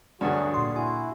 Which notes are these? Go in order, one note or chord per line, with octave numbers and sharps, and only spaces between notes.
D2 G2 F#3 F#4 G#4 D5 F#5
A#2 G#4 C6
E4 F#4 G#5